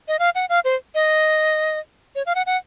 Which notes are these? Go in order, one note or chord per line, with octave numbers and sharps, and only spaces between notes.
D#5
F5
F#5
F5
C5
D#5
C#5
F5
F#5
F#5